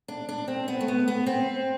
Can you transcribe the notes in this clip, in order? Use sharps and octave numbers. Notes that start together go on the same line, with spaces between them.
D4
D4
C4
B3
A3
B3
B3
C4